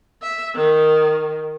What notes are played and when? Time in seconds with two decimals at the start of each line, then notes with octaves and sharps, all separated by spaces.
0.22 E5
0.55 D#3